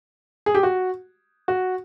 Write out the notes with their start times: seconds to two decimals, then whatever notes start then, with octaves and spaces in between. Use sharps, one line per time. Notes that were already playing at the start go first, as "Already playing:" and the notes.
0.46 G#4
0.55 G4
0.63 F#4
1.48 F#4